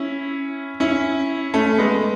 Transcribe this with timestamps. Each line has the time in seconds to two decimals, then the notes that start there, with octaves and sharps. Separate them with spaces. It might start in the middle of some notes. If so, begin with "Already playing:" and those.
Already playing: C#4 E4
0.80 C#4 E4
1.54 A3 C#4
1.78 G#3 B3